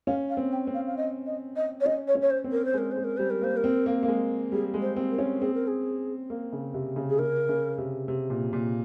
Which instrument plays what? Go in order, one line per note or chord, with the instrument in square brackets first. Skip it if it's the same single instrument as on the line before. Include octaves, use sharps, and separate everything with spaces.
[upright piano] C#4 [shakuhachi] F5
[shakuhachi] F5
[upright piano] C4
[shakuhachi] G5
[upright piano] C4
[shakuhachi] F5
F5
D#5
D#5
D#5
C#5
[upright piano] C#4 [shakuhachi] D#5
[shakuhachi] C#5
[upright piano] C#4
[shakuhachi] C#5
C5
[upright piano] C4
[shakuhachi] A#4
C5
[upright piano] G#3 [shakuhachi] A#4
[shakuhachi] C5
[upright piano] G#3
[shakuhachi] A#4
[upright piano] G3 [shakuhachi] C5
[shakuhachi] A#4
[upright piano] A#3 [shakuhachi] C5
[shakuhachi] A#4
[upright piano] C4
A#3
A#3
G#3
[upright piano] G3 [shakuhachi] G#4
[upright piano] G#3
[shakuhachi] C5
[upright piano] C4
[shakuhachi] A#4
[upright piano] C#4
[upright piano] C4 [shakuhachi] G#4
[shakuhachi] A#4
G#4
[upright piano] A#3
C#3
C3
C#3
[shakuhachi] G#4
[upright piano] C#3 [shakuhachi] A#4
[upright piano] C#3
C3
C3
A#2
A#2